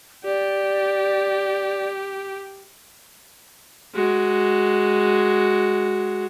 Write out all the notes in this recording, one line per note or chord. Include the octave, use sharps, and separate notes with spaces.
G4 D5
G#3 F#4